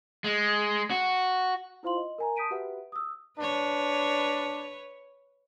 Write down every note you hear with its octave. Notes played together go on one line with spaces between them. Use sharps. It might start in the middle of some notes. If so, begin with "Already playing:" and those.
G#3
F#4
E4 F4 C5 F5 C6 F#7
D#5
A#4 G#5 A#5
A5 D#6 G6 B6 D7 D#7
F#4 G4 B4 E5 F#5
D#6 E6
D4 B4 C#5